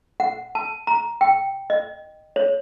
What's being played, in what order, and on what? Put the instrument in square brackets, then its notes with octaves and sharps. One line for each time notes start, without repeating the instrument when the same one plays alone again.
[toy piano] F#5
A5
A#5
G5
D#5
C#5